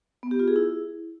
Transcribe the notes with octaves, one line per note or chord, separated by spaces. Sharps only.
B3
G4
F4
G#4
E4